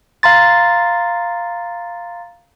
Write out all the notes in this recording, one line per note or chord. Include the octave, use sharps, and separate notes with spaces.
F5 A#5 C6 A6